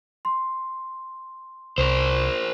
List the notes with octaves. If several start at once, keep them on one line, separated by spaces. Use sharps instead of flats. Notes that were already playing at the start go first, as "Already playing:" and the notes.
C6
C2 A#4 C5